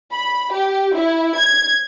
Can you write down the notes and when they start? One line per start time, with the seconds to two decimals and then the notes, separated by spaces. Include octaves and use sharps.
0.12 B5
0.52 G4
0.95 E4
1.36 G#6